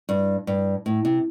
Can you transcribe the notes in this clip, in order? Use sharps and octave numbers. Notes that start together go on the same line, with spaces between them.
G2
G2
A2
C3